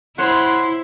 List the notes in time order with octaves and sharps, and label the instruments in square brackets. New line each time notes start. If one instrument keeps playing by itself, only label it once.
[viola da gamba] E4 [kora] C5 C#5 [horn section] F#5 B5 C6